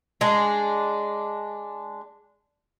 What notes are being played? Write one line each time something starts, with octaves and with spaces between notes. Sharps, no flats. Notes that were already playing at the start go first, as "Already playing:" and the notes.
G#3 D4